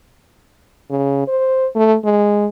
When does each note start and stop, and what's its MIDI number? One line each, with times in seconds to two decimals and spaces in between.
0.90 1.27 49
1.28 1.67 72
1.76 1.96 57
2.05 2.47 56